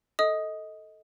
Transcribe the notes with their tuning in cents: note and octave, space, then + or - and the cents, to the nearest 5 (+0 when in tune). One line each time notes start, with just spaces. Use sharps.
A4 +0 D#5 +20 D#6 +0